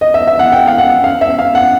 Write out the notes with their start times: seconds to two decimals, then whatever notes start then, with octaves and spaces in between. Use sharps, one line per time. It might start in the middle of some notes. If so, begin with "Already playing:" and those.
0.01 D#5
0.14 E5
0.28 E5
0.39 F#5
0.52 G5
0.67 F5
0.78 F#5
1.04 F5
1.21 E5
1.39 F5
1.55 F#5